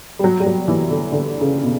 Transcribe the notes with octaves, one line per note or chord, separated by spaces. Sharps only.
G3
F#3
G3
F#3
E3
D3
D3
C#3
B2